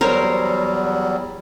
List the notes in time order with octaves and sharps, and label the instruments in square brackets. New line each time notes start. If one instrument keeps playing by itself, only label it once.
[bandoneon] E2 F#3 G3 [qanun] A#4 C5 C#5